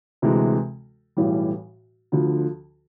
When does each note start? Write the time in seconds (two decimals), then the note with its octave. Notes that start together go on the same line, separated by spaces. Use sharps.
0.22 D2 C3 E3 G#3
1.17 B1 A2 E3 G3
2.12 D2 D3 F3